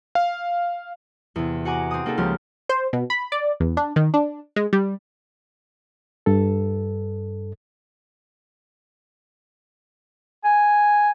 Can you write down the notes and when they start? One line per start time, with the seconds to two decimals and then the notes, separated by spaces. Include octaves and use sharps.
0.15 F5
1.36 E2 C3
1.65 F#4 F#5 G#5 A#5 D6
1.91 C4 D#6
2.06 A#3 D4 D#4 G#4 A4
2.18 C#2 F3 G4 F6
2.69 C5
2.93 B2
3.10 B5
3.32 D5
3.60 E2
3.77 D4
3.96 D#3
4.14 D4
4.56 G#3
4.73 G3
6.26 G2 A4
10.44 G#5